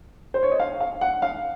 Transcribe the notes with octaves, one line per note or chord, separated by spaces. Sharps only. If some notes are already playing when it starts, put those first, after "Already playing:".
C5
C#5
D#5
F5
F5
F#5
F5